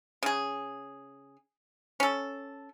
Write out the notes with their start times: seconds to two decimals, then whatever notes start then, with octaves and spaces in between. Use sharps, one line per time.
0.23 C#3 G#4
2.00 C#4 A4